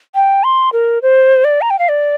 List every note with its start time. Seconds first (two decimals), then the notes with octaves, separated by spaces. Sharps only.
0.15 G5
0.44 C6
0.73 A#4
1.02 C5
1.44 D5
1.61 A#5
1.70 G5
1.79 F5
1.89 D5